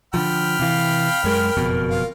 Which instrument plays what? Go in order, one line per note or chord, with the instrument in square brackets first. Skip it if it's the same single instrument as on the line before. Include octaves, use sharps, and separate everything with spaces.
[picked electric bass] D3 D#3 F3 [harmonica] G5 B5 F6
[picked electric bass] C3 E3 [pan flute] F5
[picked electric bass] F#2 G#3 [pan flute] A#4
[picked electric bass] F#1 F2 B2
[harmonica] F4